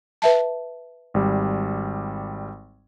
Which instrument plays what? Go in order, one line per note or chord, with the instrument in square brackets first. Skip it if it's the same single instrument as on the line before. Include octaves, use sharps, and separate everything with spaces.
[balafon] B4 E5 A5
[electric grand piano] G#1 G3